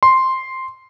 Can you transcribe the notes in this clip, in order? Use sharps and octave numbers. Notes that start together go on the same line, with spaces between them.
C6